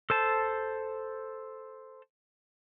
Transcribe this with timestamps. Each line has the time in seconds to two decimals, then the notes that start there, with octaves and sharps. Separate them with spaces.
0.10 A4 C5 A5